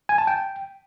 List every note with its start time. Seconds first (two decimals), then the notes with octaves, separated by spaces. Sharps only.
0.09 G#5
0.18 A5
0.27 G5